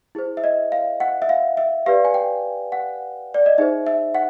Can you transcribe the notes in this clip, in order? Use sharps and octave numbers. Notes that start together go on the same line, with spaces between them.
E4 G#4 C5
E5
D#5
F5
F#5
E5
F5
E5
G4 B4 D5 F5
G#5
G5
F#5
D5
D#5
D#4 G#4 C5 E5
E5
F#5